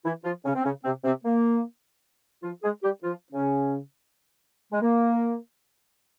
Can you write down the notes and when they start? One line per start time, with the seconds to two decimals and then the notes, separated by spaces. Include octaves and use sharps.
0.05 E3 E4
0.25 F3 F4
0.45 C#3 C#4
0.55 C4
0.64 C#3 C#4
0.84 C3 C4
1.04 C3 C4
1.25 A#3
2.43 F3 F4
2.63 G#3 G#4
2.83 G3 G4
3.03 F3 F4
3.33 C#3 C#4
4.73 G#3
4.82 A#3